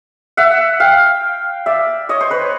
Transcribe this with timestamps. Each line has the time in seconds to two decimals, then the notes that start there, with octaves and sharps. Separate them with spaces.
0.37 E5 F#5
0.80 F5 G5
1.66 D5 E5
2.09 C#5 D#5
2.21 C5
2.31 B4 C#5